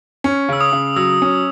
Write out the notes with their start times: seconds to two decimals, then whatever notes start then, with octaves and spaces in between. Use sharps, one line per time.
0.24 C#4
0.49 C#3 E6
0.61 D#6
0.72 C#3
0.96 F#3 E6
1.22 C#4